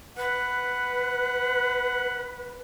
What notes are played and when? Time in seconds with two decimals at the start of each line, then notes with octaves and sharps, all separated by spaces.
0.18 B4 F#5